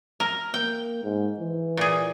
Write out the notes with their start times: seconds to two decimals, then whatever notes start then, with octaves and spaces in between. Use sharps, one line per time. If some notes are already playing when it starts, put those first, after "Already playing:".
0.20 A#4
0.54 A#3 G5
1.03 G#2
1.39 E3
1.77 A#2 G#4